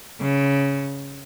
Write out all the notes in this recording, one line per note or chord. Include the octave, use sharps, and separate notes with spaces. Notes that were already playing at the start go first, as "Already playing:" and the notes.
C#3